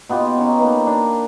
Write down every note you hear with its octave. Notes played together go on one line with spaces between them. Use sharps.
B2 B3 F4 G4
C#4 D#4
A#3 B4
D4 A#4